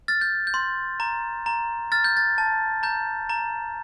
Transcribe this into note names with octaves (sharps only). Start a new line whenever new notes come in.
F6 A6
G6
G6
C6
A#5
A#5
F6 A6
G6
A6
A5
A#5 G6
A#5